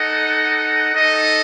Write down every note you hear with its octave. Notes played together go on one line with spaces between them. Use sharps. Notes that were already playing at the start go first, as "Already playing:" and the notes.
Already playing: D#4 A4 D#5 F#5
D#4 A4 D#5